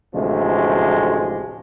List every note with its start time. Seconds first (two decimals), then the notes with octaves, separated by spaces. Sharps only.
0.14 A1 D2 C3 F3 G#3